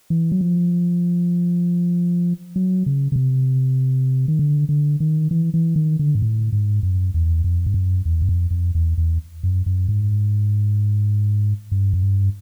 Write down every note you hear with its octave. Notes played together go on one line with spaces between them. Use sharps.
E3
F#3
F3
F#3
C#3
C#3
C3
D#3
D3
D3
D#3
E3
E3
D#3
D3
G#2
A2
G#2
F#2
E2
F2
G2
F#2
E2
F#2
F2
F2
E2
E2
F#2
F#2
G#2
G2
F#2
G2